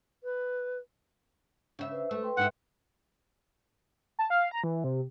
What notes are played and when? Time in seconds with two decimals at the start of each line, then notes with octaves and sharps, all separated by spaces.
0.24 B4
1.79 C#3 E5
1.92 B4 C5
2.11 A3
2.23 B4 G5 C6
2.37 G#2 D#4 E5 F#5
4.19 A5
4.30 F5
4.51 A#5
4.64 E3
4.84 C3